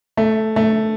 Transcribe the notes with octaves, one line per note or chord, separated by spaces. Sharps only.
A3
A3